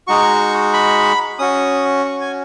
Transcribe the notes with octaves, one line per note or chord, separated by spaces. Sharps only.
G#3 D#4 F#4 C#6
B5
C#4 F#4 D#6
C#6
G#5